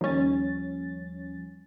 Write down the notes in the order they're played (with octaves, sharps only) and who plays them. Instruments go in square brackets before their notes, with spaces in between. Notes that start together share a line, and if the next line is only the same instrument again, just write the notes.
[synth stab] D#2 C#4 [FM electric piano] F3 G3 A6